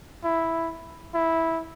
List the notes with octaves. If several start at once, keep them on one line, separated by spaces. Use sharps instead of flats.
E4
E4